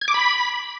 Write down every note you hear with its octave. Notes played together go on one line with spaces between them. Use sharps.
G#6
D6
B5